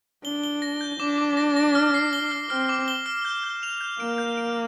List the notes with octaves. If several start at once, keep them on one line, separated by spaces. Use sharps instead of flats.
D4 G7
G7
A#6
G6
D4 D6
D6
A#6
A#6
F6
C7
G7
F6
C4 F6
D6
G7
F6
G6
G6
F7
G6
A#3 D7
G6
D7